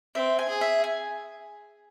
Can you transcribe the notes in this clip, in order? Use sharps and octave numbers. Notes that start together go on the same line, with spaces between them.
C4 E5
G#5
G#4
E5
G#5